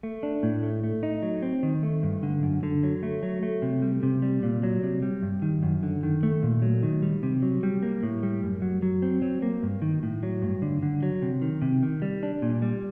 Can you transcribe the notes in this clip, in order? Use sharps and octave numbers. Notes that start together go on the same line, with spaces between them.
A3
D4
A2
A3
A3
D#4
F#3
C4
D#3
A3
G2
D3
F#2
D3
F#3
A3
F#3
A3
C3
G3
C3
G3
A#2
F#3
C3
G3
G2
D#3
F#2
D3
D#3
A3
A#2
F#3
D#3
G3
C3
F#3
G3
A#3
A2
G3
F#2
F#3
F#3
C4
F#3
A#3
G2
D#3
A2
F#3
G2
D3
D3
F#3
C3
D#3
C3
D#3
G3
D4
A#2
G3